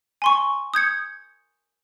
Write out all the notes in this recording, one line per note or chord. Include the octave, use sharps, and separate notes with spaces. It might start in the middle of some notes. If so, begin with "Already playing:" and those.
G#5 C6 C#6
D#6 G6 G#6 C#7